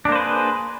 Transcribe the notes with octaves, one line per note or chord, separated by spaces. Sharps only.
A#3 D4 G#4 B4 C5